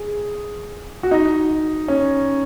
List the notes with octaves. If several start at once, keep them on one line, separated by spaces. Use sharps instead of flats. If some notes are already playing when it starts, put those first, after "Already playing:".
Already playing: G#4
F#4
D#4
C#4